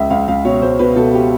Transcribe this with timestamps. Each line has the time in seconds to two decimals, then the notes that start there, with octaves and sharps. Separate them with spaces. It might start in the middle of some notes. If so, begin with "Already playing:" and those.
Already playing: C#2 E5
0.10 C#2 F5
0.28 C#2 F5
0.45 B2 C#5
0.62 C#2 C5
0.79 B2 B4
0.96 B2 A4
1.14 G4